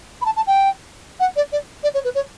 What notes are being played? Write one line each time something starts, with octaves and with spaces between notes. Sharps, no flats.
B5
A5
A5
G5
F#5
D5
D5
D5
C#5
B4
C#5